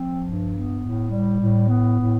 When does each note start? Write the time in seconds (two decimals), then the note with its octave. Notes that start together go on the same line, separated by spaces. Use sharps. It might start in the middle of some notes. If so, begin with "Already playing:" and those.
Already playing: F3 C4
0.22 G2
0.52 B3
0.80 A2
1.11 G3
1.40 A2
1.68 B3
1.99 A2